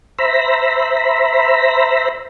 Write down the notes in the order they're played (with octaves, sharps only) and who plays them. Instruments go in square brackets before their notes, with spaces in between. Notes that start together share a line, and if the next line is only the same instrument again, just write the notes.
[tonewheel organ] C5 E5 A#5 B5